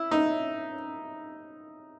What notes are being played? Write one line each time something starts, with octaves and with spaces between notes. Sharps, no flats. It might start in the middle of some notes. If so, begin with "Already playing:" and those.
Already playing: E4
D#4